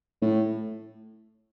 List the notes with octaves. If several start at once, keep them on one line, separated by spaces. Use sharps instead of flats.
A2